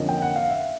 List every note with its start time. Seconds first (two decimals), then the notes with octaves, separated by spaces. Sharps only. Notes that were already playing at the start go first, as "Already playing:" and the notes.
Already playing: F2 D3 F3 A#3 C#4 D#5
0.09 G5
0.22 F#5
0.36 F5
0.50 E5